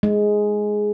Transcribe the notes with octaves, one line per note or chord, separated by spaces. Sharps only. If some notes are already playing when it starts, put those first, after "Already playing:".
G#3